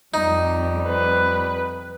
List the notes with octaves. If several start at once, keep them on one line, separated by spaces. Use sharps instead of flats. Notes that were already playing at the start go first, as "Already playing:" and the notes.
F2 G3 D#4
B4